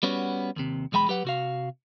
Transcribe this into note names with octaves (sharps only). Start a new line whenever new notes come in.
G3 B3 C#4 F#4
D#2 C3
B1 E2 G#3 G5 B5
F#3 G4 B4 F#5
C3 F#4 F5